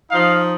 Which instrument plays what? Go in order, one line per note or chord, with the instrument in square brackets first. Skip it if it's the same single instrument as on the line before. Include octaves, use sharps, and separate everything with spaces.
[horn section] F3 D#4 F5